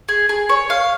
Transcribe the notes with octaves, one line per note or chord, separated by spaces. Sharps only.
G#4
G#4
C#5
F5